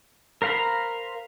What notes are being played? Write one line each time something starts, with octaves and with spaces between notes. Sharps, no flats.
A#4 C5 F5 A#5 B5